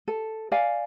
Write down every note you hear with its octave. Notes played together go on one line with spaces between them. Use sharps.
A4
D5 F5 G#5